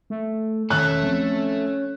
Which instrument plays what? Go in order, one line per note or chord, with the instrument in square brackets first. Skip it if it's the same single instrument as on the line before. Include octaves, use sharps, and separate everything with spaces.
[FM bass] A3
[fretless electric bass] E1 D#3 [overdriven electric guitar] A3 A4 [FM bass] C#4 [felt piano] F#6
[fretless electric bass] F3 C4